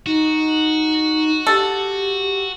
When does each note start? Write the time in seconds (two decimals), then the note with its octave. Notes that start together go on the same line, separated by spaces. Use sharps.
0.06 D#4 F#4
1.47 G4 A4